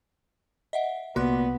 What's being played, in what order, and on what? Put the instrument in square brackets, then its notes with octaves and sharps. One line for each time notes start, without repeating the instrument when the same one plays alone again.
[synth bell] D#5 E5 F#5
[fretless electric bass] C2 [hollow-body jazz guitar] A#2 [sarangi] B3 [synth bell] F#4 C6 F#6